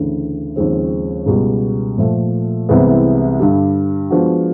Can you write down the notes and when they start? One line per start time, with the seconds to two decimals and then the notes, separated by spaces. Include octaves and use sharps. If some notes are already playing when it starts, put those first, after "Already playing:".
Already playing: D2 C#3 E3
0.56 D#2 C#3 F3 G#3 C4
1.26 C#2 B2 G3
1.98 A#2 F3 A3
2.69 C2 C3 E3 G#3 B3
3.40 G2 D3 G3
4.10 F3 G#3 B3 D4 F#4